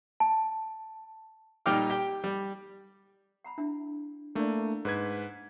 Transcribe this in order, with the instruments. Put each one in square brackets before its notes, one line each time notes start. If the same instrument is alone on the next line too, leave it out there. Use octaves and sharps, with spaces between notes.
[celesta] A5
[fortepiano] A#2 G3 D#4 G5 D6 F6
G4 G5
G3
[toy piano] F#5 A#5 B5
D4 E4 E5
[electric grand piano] A3 A#3 [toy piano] D4 E4 D5
[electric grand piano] G#2 B4 G#6 [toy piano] C5